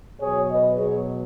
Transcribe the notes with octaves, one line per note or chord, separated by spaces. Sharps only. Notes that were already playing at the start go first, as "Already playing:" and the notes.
B2 F#3 G#4 C#5
B4 D#5
B2 F#3 G#4 C#5